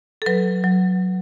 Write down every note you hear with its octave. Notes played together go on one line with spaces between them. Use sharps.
A4
F#3 B4
F#3